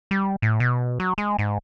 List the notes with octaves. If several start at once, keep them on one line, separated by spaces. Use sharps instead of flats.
G3
A2
B2
F#3
G#3
G#2